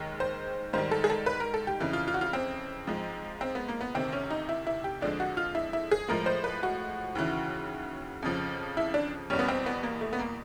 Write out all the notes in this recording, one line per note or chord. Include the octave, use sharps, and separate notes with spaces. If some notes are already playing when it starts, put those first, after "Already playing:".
Already playing: D#2 D#3 G#3
C5
G#2 D#3 G3 C5
A4
G#4
A4
B4
A#4
A4
G4
F2 C#3 E3
F4
F4
F#4
F4
C4
G#2 F3 G#3
C4
B3
A#3
B3
D2 C3 D#3 C4
C#4
D#4
E4
E4
G4
F2 D3 F3 G#3 D4
F#4
F4
E4
E4
G#4
A2 F3 G#3 A#4
C5
B4
F#4
D#2 C#3 E3
F2 C#3 F3
E4
D4
E2 B2 G3 C#4
B3
C4
B3
A#3
A3
B3
A#3